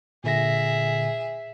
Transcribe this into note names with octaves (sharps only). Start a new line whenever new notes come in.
A#2 D3 G#4 E5 A#6